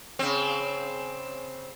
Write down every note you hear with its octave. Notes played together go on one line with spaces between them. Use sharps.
C#3 C4